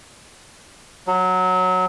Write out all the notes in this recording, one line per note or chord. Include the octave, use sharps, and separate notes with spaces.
F#3